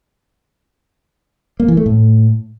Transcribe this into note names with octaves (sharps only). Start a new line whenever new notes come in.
A#3
E3
A3
A2